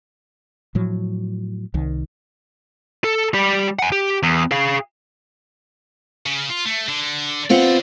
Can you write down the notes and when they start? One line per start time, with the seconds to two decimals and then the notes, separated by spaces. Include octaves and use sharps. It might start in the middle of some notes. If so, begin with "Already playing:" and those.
0.75 A2 F3 F#3
1.74 C2 D#3
3.04 A4
3.34 G3 G4
3.79 F#5 G#5
3.92 G4
4.23 E2
4.51 G#4 F5
6.26 C#3
6.50 F4
6.65 A3
6.88 D3
7.50 B3 C4 F4 D5 F#5